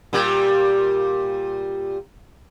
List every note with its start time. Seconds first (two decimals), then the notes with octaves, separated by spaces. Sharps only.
0.13 A#2 G3